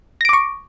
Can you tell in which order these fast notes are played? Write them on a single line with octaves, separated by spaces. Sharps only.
A#6 D7 D6 C#6